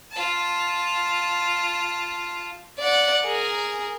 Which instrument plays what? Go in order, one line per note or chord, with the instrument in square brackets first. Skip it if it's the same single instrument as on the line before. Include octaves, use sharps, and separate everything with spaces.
[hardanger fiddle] F4 A5
[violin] D5 F#5
G#4 A#4